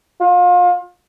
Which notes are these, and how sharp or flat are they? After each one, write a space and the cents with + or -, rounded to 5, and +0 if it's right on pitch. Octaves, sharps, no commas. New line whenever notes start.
F4 +30